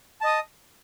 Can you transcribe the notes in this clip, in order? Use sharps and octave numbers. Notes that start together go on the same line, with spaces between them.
D#5 A5 D#6